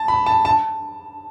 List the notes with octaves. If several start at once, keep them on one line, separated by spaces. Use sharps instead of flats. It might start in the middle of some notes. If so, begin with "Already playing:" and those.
Already playing: A5
B5
A5
A5